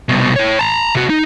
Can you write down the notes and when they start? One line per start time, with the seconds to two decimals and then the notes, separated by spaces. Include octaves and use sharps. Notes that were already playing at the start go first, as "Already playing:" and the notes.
0.09 C2 B2
0.36 E4 C#5
0.59 A5 A#5
0.95 C3 F#4
1.10 D#4